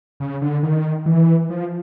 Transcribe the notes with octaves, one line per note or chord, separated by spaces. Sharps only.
C#3
D3
D#3
E3
F3